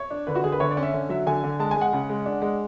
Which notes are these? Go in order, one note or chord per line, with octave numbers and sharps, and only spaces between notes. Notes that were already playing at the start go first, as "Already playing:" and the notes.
Already playing: C#5
D4
D3 B4
F#4
D3 G#4
B4
D3 C#5
D5
C#4
E5
D3
F#3 E5
D3 G#5
D3
G#3 A5
G#3 G#5
F#5
C#3
G#3
D4
G#3